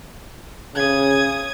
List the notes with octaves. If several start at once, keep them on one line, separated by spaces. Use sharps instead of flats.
C#3 D#6 G#6